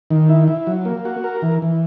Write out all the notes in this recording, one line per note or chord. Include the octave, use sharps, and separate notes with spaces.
D#3
E4
E4
F#3
A#3
F#4
A#4
E3
E3